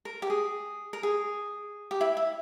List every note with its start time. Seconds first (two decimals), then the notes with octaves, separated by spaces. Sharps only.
0.05 A#4
0.22 G4
0.30 G#4
0.93 A#4
1.03 G#4
1.91 G4
2.01 E4
2.17 E4